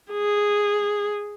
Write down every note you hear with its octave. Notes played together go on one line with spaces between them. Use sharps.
G#4